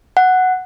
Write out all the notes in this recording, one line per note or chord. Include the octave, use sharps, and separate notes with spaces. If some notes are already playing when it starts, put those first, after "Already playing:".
F#5